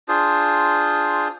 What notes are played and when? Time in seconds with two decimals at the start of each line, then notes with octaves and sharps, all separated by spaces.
0.08 D4 F4 G#4 C5